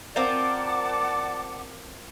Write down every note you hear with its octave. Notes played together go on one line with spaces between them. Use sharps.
C4 F4 A#4 D5 F#5 A5 D6